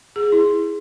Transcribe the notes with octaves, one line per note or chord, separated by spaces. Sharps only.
G#4
E4